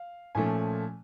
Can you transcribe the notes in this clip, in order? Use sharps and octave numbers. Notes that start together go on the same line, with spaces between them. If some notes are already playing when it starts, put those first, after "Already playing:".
Already playing: F5
A#2 F3 A3 C#4 G#5